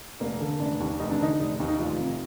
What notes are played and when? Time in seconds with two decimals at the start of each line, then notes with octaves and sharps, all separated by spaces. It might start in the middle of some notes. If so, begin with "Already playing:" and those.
0.20 F1 A#3
0.41 D3
0.60 F1 D4
0.80 D#2
1.00 F1 D#4
1.11 D4
1.20 D3 D#4
1.40 F1
1.60 D#2
1.68 D#4
1.79 F1 F4
1.99 C3